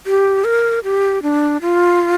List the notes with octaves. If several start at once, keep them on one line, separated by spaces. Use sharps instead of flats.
G4
A#4
G4
D4
F4